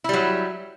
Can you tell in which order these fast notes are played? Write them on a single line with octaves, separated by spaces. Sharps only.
E4 G3 F#3